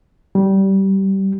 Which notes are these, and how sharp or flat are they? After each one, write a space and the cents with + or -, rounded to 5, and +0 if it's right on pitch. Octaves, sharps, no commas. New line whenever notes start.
G3 -20